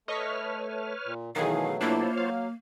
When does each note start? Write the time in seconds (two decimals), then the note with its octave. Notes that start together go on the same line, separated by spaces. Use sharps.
0.08 A3 B4 C#5 D#5 C#6 F6 B6
1.06 A#2
1.36 B2 D#3 E3 F#3 A3 G#4 F5
1.81 A#3 D4 E4 F4 C5 C#5
2.17 F#3 F5